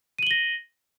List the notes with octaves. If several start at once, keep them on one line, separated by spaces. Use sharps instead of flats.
A#6 D#7 F#7 G7